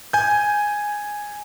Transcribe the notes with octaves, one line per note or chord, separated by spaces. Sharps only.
G#5 G6